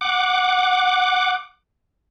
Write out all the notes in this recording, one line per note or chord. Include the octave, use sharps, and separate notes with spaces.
F#5 D6